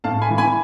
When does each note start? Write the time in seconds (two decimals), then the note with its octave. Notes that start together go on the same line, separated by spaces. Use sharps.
0.04 A2 F5 A5
0.21 G#5 B5
0.30 E3
0.38 G#5 B5